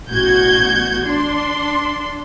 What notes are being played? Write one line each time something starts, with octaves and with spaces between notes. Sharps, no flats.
A1 B2 F#4 G6 G#6
D4 C6